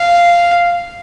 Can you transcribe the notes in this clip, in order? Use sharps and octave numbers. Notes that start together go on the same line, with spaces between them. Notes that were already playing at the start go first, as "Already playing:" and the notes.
Already playing: F5